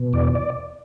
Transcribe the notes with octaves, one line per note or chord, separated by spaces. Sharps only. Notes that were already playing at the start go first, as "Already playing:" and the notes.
Already playing: B2
E2 D5
D5